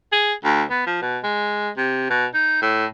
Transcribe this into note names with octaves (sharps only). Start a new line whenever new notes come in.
G#4
D2
B3
F3
B2
G#3
C3
B2
D#4
A2